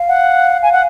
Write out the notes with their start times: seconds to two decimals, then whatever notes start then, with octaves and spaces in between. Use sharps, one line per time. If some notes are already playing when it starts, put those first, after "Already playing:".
Already playing: F5
0.08 F#5
0.63 G#5
0.72 F#5